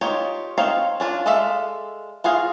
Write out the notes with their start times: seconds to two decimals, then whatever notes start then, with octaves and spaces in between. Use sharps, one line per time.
0.01 D#4 F4 G4 C5 C#5
0.58 C4 D#4 C#5 F5
1.00 C#4 D4 F4
1.26 G#3 A4 D5 E5 F5
2.24 F4 F#4 G#4 F5